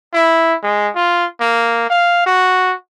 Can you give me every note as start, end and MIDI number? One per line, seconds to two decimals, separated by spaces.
0.13 0.55 64
0.63 0.90 56
0.95 1.26 65
1.40 1.88 58
1.90 2.24 77
2.26 2.75 66